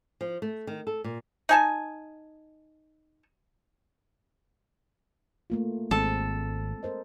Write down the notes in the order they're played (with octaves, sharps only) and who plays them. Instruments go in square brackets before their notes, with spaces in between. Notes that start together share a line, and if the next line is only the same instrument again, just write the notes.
[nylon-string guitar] F3
A3
D#3
A4
A#2
[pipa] D#4 G#5 A5
[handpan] A3 A#3 F4
[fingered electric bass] G#1 [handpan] G#3 C4 [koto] A4
[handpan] A#4 C5 D#5